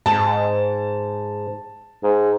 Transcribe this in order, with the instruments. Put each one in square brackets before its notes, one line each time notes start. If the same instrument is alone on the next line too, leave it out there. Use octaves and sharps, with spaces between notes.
[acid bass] G#2 [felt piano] A5
[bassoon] G#2